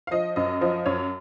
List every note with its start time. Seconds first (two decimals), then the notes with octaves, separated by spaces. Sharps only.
0.07 F5
0.11 F3 D#5
0.36 F#2 D#5
0.61 F3 D#5
0.86 F#2 C#5